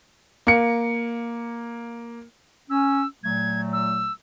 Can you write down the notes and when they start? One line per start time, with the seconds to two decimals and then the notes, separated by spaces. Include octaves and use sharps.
0.47 A#3 C#7
2.70 C#4 E6
3.24 A#2 F#3 A3 G#6
3.73 E6